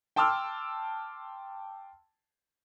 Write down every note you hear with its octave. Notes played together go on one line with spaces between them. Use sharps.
G5 A5 C6 D6 E6 F6